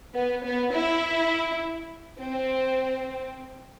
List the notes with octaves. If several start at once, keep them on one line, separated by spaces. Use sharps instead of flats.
B3
B3
E4
C4